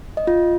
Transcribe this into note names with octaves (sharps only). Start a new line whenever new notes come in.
D#5
F4